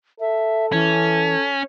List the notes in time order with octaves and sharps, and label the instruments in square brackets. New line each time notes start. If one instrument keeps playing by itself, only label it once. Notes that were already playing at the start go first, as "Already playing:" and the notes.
[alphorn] A4 [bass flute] E5
[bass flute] E3 [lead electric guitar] C#4